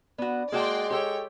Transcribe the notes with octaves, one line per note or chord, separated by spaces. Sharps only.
B3 D4 F#4
G#3 A#3 F#4 D5 G5 A5 C6
G4 A4 C#5 G5